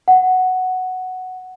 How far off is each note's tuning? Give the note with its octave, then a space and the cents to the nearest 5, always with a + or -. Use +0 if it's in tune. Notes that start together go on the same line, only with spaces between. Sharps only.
F#5 +0